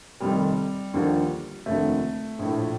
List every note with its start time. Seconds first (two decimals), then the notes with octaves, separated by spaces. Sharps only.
0.20 F1 F2 D#3 G3
0.94 D#2 D3 F3
1.66 F1 D#2 D3 F3 A3
2.39 A#1 A2 F3